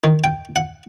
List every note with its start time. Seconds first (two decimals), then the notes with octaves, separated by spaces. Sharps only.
0.04 D#3
0.24 G5
0.56 F#5